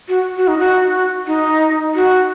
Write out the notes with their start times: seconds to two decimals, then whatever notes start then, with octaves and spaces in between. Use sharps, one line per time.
0.08 F#4
0.37 F#4
0.48 D#4
0.59 F#4
1.27 D#4
1.95 F#4